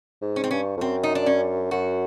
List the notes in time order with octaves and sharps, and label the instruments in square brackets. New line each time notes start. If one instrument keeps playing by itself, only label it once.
[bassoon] G#2
[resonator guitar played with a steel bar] C#4
C4
[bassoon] G2 [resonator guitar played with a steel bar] C#4
[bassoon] F2
[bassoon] F#2 [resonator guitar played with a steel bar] C4
[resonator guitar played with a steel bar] D#4
D4
C#4
[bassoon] F#2 [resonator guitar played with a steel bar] F#4